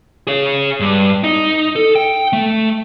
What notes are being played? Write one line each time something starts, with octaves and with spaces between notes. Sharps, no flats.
G#4 C#5
G2
D#4
A4
G5
A3